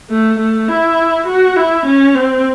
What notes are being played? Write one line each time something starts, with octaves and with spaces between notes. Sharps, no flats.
A3
A3
E4
F#4
E4
C#4
C4